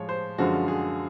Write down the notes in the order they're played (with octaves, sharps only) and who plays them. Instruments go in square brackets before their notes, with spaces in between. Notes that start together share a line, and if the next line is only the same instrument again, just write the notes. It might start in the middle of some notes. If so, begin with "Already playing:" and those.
Already playing: [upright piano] A2 F3 G#3 C#5
C5
F#2 D3 F3 G#3 F#4
G#4